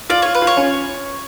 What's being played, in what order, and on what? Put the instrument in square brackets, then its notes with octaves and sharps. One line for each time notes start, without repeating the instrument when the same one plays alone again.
[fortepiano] F4 [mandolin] D5
[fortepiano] F4 [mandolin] C#5
[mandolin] B4
[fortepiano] F4
[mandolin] C#5
[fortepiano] C#4